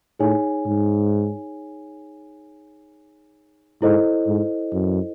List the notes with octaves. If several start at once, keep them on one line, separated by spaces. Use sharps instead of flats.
A2 D#4 G#4 C#5 G#5
G#2
G#2 E4 A4 C5 D#5
G#2
F#2